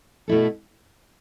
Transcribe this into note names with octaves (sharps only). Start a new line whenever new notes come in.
B2 A3 E4 A4